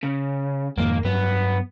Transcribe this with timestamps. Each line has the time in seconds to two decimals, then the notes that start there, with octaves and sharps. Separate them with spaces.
0.03 C#3
0.78 F2 G#2 D#3 A#3
1.05 G2 F#3 B3